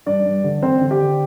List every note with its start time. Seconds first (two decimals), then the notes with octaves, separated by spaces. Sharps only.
0.06 G2 D4 D5
0.25 G2
0.44 D3
0.63 D3 C4 C5
0.81 D3
0.91 G4 G5
1.00 D3